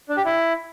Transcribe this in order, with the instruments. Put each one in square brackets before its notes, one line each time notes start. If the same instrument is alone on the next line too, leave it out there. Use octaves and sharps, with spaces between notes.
[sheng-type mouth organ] D4
G4
E4